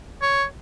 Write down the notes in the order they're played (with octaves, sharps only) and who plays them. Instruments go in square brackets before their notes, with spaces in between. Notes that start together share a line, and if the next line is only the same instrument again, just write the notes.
[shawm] C#5